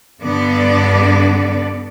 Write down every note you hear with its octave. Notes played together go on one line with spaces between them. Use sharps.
G2 D3 B3 D5